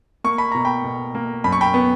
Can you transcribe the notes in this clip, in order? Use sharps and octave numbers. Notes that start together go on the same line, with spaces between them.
A#3 C#6
B5
B2 A#5
G5 B5
B2
A#3
F#2 B5
C#6
G5 B5
B3